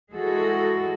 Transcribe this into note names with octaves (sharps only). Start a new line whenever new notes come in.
E3 G#3 F#4 G#4 A4